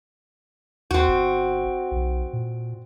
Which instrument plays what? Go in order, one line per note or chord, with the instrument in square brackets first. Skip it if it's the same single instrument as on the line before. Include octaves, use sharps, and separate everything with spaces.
[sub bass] D#2 [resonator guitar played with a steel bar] C4 F#4
[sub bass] G1
B1
A#2